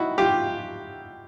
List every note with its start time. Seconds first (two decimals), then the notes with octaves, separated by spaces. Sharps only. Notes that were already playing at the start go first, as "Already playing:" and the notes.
Already playing: D#4 E4 F#4
0.18 F4 G4